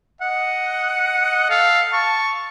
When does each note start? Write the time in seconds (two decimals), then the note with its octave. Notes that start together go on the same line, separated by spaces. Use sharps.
0.21 D#5 F#5
1.50 A4 F5
1.93 A5 C#6